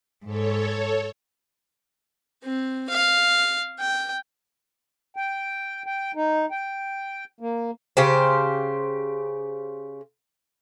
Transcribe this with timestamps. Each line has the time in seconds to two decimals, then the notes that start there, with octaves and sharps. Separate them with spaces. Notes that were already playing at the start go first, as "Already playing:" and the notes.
0.24 G#2 A4 C#5
2.44 C4
2.90 F5
3.80 G5
5.16 G5
5.86 G5
6.15 D#4
6.51 G5
7.41 A#3
7.97 C#3 G4 C5